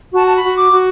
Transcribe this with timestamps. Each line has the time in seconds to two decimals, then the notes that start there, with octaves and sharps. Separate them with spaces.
0.13 F#4 A5
0.25 A5
0.35 B5
0.43 F#4
0.56 D6
0.71 F#4